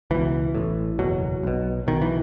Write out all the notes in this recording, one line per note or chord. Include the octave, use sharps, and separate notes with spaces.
C#2 B2 E3
A1 A2
F#1 E2 B2 F#3
B1 B2
B1 B2 D#3
E3